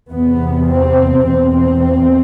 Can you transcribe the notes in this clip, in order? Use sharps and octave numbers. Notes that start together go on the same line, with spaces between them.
E2 C3 B3
C4
E2 B2 C4
C4
C4